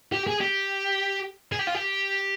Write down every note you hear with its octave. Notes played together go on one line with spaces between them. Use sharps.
G4
G#4
G4
G#4
G4
F4
G4